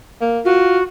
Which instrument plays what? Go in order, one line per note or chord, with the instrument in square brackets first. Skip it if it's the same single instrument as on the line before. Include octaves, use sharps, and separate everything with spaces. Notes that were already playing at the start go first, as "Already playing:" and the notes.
[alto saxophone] A#3
[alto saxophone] F4 [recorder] F#4